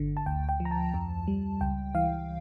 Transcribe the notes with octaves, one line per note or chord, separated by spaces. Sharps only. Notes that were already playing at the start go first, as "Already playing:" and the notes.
Already playing: G1 D3
A5
D2 G5
G5
F3
A#5
A5
F2
G3
C#2 G5
E3 F5